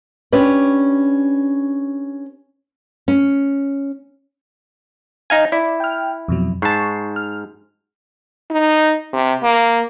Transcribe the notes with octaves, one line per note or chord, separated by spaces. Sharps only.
C#4 D4 G4 B4
C#4
D#4 F5 G#5
E4 D5
G5 F6
F2 B2 F#3
G#2 A5 C#6 C7
F6
D#4
C3
A#3